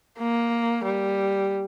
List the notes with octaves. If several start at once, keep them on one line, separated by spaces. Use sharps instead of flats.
A#3
G3